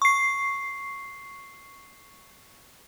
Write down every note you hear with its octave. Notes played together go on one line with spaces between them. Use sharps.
C#6 C7